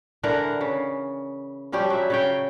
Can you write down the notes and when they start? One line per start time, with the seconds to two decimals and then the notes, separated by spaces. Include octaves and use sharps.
0.23 D3 E3 A#4 F#5
0.61 C#3
1.72 F3 G3 C#4 G4
1.90 F#3 E5
2.10 C#3 C#5 G5